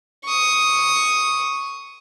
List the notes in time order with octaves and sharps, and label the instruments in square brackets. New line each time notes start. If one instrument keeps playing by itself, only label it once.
[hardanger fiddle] C#6 D#6